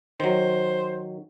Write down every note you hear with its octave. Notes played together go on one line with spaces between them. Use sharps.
D#3 F#3 C5